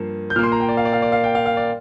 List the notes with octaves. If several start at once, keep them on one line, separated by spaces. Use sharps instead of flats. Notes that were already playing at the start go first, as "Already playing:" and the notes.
Already playing: G2 F3 A#3
G6
A#2 A#3 C6 F6
A#5
G5
D5
F5
D5
F5
D5
F5
G5
F5
F5
D5